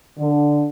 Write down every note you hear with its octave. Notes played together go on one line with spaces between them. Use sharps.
D3